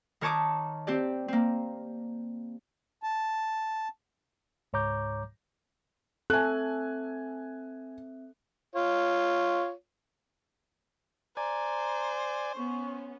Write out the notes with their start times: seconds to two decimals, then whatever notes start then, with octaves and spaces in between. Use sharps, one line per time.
0.21 D#3 A#4 C#5 A5 D6 D#6
0.87 C4 G4 D5
1.28 A#3 C4
3.03 A5
4.73 C#2 G#2 C#5 A#5 D6 G6
6.30 C4 A4 E5 G#5 F#6
8.75 F4 C#5
11.37 C5 D5 G#5 A#5
12.55 B3 C#4 C#6